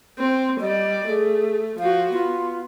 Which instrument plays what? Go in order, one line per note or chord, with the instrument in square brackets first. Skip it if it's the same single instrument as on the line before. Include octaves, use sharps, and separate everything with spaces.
[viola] C4
[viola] G3 D5 [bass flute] D#5
[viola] A3 [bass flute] G#4
[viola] F3 F#4 [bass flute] F5
[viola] B3 [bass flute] F4